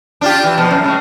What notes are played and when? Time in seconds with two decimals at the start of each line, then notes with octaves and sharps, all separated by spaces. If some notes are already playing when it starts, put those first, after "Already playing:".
0.21 D4 F4 G4
0.44 E3
0.58 B2 F3
0.71 F#2
0.83 A2 C#3 G#3